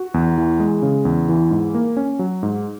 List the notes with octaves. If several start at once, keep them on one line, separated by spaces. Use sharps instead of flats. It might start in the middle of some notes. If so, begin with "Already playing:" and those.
Already playing: F#4
E2
E3
G#3
C#3
E2
E3
G#2
A#3
C#4
F#3
G#2